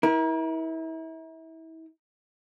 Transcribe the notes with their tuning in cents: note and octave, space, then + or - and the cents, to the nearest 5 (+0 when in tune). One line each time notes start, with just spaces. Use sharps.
E4 -30 A#4 +35